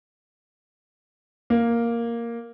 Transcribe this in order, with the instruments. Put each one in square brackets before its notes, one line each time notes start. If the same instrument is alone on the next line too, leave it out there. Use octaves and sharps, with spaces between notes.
[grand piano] A#3